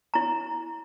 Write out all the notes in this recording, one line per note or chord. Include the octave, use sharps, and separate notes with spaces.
E4 A#5